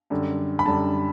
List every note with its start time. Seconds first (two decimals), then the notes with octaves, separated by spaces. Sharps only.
0.10 F#2 D3 G3
0.59 B5
0.66 F#2 D3 G3 A5